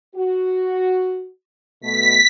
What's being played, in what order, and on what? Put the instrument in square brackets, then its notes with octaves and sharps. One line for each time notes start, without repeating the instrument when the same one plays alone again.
[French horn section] F#4
[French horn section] B2 A3 [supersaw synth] B6